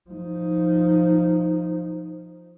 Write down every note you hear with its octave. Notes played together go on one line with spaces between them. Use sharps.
F3 D#4